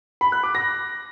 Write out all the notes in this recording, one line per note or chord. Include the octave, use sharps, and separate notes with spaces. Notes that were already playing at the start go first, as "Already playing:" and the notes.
B5
F#6
D6
A#6